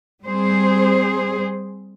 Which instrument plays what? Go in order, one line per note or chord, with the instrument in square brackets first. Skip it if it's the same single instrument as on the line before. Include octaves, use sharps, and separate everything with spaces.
[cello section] G3 C4 G#4 C5